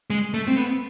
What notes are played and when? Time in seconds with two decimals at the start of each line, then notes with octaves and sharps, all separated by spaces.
0.10 G#3
0.34 A3
0.47 C4
0.57 B3